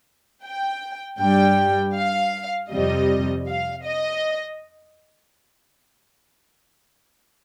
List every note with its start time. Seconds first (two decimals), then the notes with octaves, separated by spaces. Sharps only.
0.46 G5
1.21 G2 G3 G5
1.95 F5
2.71 F2 C3 G3 D#5
3.47 F5
3.84 D#5